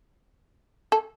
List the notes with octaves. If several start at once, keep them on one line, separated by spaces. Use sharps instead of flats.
A4